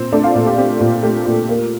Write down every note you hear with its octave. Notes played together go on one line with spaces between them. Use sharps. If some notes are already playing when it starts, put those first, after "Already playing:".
Already playing: A#2 C4
A3 D4 D5
F4 F5
A#2
G4
C4 G4
A#2
A3 G4
A#2
A#3